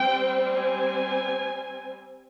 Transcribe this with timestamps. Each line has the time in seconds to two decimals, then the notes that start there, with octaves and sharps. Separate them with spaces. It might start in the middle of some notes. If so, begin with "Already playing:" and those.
Already playing: G3 C4 G5
0.49 G#5